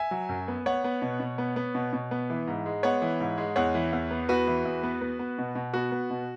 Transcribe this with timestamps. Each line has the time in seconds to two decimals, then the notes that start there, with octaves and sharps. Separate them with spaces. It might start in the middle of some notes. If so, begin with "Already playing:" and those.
Already playing: E5 G#5
0.11 F#3
0.29 F#2
0.48 B3
0.66 B3 C#5 F#5
0.84 B3
1.02 B2
1.20 B2
1.38 B3
1.56 B3
1.75 B2
1.93 B2
2.11 B3
2.30 E3
2.47 G#2
2.66 G#3
2.83 B3 C#5 F#5
3.02 E3
3.20 G#2
3.38 G#3
3.56 E2 C#5 F#5
3.75 E3
3.93 E2
4.11 B3
4.29 E2 F#4 B4
4.47 E3
4.65 E2
4.83 B3
5.01 B3
5.19 B3
5.38 B2
5.55 B2
5.74 B3 F#4
5.92 B3
6.10 B2